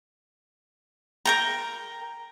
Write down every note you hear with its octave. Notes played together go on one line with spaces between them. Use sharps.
A#4 G5 A#5